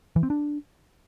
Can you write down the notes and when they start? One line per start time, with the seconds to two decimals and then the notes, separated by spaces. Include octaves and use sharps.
0.16 E3
0.23 C4
0.30 D4